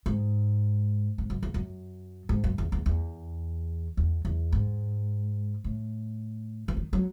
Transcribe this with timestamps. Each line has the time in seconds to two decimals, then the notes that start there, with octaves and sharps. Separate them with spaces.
0.06 G#2
1.18 G#2
1.30 F#2
1.43 E2
1.54 F#2
2.29 G#2
2.44 F#2
2.58 E2
2.72 E2
2.86 E2
3.97 E2
4.25 E2
4.52 G#2
5.64 A2
6.68 E3
6.77 D#3
6.93 F#3